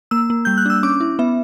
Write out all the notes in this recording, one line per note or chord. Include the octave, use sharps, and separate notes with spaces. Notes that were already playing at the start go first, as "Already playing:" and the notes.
A#3 E6
A#3
G3 G6
F#6
D4 E6
C#4 D6
E4
B3 E5